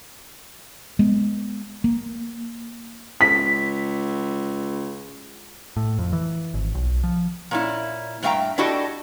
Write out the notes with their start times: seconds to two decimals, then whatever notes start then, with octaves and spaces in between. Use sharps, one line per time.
0.99 G#3 B3
1.84 A#3
3.21 C#2 B6
5.77 A2
5.99 F2
6.13 E3
6.54 G#1
6.75 B1
7.04 F3
7.51 A#2 C#4 E4
8.23 G2 A3 E5 F5 G5 A#5
8.58 D4 E4 F#4 G4 A4 D#5